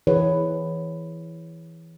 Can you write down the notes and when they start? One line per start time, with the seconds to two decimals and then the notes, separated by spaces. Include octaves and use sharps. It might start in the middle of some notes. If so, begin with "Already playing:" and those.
0.07 E3 G#4 B4 C#5